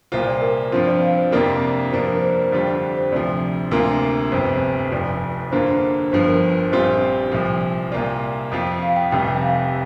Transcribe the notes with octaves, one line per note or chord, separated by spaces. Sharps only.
C2 A#2 A#3 F4 C5
D5
A#4
G2 F3 C4 F4 C5
D5
F5
C5
F2 C3 A#3 D4 F4 A#4
A#4
G2 F3 A#3 D4 C5
A#4
C5
F2 D3 G3 D4 F4
C5
D2 C3 F3 D5
D2 C3 A#3 F4 A#4
G1 F2 C3 C5
F1 F2 F3 D5
G2 D3 A#3 F4 C5
G1 G2 F3 C5
A#4
A#1 A#2 G3 C4 F4 C5
C2 A#2 F3
C2 A#2 A#3 F4 D5
F2 F3 C4 F4
F5
G5
F1 F2 C3 G3 G5
G5
F5